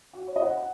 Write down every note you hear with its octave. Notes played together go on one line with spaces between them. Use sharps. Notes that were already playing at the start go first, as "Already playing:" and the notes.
F#4
C#5
D#5
F#5
F#5